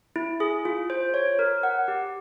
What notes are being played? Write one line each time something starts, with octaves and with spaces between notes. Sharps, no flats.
E4
G#4
F4
C5
C#5
A#4
F#5
G4